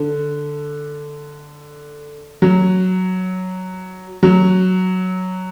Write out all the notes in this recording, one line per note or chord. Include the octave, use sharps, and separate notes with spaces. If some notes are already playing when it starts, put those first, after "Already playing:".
Already playing: D3
F#3
F#3